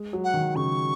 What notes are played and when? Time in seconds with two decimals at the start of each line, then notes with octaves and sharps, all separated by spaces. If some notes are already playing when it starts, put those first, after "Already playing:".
Already playing: G#3
0.13 F#3
0.24 F#5
0.34 D#3
0.55 C#3 C#6